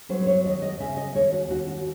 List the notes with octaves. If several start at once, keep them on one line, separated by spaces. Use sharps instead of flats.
F#3 C5
C5
C#5
D#2 D#5
D#5
C#3 E5
D#5
D#2 C#5
F#4
D#2 F#4
F#4